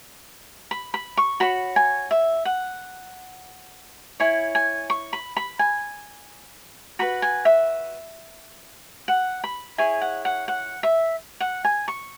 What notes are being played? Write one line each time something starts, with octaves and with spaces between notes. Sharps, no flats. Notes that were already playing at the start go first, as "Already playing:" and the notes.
B5
B5
C#6
F#4 C#5 B5
G#5
E5
F#5
E4 C#5 G#5
G#5
C#6
B5
B5
G#5
F#4 B4 B5
G#5
E5
F#5
B5
E4 G#4 C#5 G#5
F#5
F#5
F#5
E5
F#5
G#5
C#6